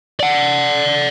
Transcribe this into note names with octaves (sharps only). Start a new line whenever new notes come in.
D5 F#5